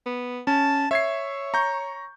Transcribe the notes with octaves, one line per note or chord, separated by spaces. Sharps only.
B3
C#4 A5
C#5 E5 G#6 C7
A#5 C#6 G6